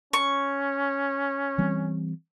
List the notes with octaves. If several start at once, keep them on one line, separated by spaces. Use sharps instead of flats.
C#4 C#6
E3 G3 C4